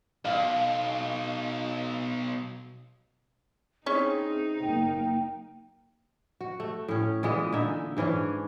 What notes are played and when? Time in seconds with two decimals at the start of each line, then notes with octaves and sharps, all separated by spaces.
0.25 B1 B2 F5
3.86 C4 C#4 D#4 E4 G#4 C#5
4.62 F#1 A#3 G5
6.41 F#4
6.60 A3
6.88 A2 C#4
7.23 A#2 E3 G#3 B3
7.52 A#2 D3 D#4 E5
7.97 G#2 E3 C#4 D4